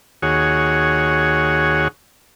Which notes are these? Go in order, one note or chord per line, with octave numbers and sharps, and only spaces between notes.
D#2 F#4 G#4 C#5